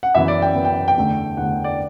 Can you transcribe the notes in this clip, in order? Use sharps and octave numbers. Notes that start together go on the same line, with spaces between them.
F#5
F#2 E3 B3 E5
D5
G5
F#2 E3 B3
G5
G5
E2 D3 A3
E2 D3 A3 F#5
D5